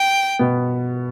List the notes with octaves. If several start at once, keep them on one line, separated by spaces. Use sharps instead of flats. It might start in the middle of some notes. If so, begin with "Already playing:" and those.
Already playing: G5
B2 B3